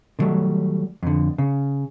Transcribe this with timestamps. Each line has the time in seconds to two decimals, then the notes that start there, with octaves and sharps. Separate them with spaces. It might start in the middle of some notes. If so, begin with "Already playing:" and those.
0.19 D3 D#3 F#3 G3 A3
1.03 F2 D3
1.38 C#3